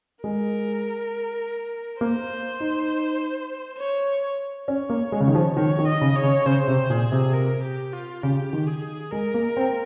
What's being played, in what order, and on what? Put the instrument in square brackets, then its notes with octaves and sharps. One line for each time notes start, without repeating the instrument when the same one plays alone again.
[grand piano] G#3 [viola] A#4
[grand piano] A#3 [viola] C5
[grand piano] D#4
[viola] C#5
[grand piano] C#4 [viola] C#5
[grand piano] A#3
G#3
C#3
D#3
F3
[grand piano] D#3 [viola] C#5
[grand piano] D#3
[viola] D#5
[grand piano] C#3
[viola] C#5
[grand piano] C#3
[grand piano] C#3 [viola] C5
[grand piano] C3
[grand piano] A#2 [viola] G#4
[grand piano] C3
[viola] A#4
G4
F4
[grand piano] C#3 [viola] G4
[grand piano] D#3
[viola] G#4
[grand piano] G#3 [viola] A#4
[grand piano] A#3
C4